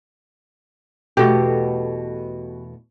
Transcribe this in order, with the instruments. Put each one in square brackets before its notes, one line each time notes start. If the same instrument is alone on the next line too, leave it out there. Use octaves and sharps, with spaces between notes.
[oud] E2 B2 A3 [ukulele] F#4 G4